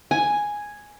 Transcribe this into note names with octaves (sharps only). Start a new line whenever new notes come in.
G#5